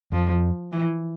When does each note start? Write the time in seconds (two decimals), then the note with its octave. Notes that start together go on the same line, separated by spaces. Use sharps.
0.12 F2 F3
0.72 E3